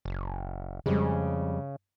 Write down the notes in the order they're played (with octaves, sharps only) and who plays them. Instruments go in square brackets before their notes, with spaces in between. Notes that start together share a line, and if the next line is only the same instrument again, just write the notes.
[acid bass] F#1
[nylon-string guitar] F2 G3 G#3 [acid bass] C#3